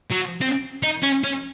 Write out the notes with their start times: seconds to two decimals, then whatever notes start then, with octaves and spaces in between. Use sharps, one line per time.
0.10 F#3
0.41 C4
0.83 D#4
1.03 C#4
1.24 C#4